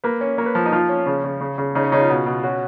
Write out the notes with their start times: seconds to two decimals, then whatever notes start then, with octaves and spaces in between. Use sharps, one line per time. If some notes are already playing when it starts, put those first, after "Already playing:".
0.04 A#3 B4
0.21 C#4
0.38 A#3 C#5
0.46 B4
0.55 F3
0.66 D#4
0.72 F3 F4
0.89 C#4
1.06 C#3
1.24 C#3
1.41 C#3
1.58 C#3
1.75 C#3 D#4
1.84 C#4
1.92 C#3 D#4
2.01 F4
2.10 B2
2.26 B2
2.43 C#4 F#4